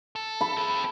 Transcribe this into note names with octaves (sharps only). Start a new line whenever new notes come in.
A4
B5
C4 A4